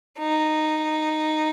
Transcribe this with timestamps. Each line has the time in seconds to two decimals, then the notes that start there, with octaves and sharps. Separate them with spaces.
0.19 D#4